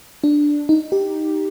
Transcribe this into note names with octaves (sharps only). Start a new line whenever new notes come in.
D4
D#4
G4